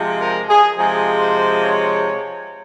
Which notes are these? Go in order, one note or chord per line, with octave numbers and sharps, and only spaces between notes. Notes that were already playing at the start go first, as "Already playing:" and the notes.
Already playing: C3 F3 G#3
A#4
G#4
C3 F3 G#3 G#4
C5
C#5